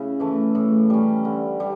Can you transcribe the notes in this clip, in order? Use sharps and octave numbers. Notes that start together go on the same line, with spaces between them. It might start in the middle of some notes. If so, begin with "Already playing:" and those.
Already playing: C#3 E4
E3 A3
A2
G3 C#4
D3
G3